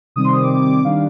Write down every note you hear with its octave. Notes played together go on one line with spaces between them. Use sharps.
C3 D#3 G3 C4 D#6
C6
D#6
D6
D#3 G3 D4 F5